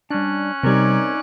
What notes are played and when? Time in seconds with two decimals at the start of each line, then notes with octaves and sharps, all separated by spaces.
0.10 G3 C#4 D4 F#6
0.63 C3 G3 C4 D#4 A#4 C#5 D5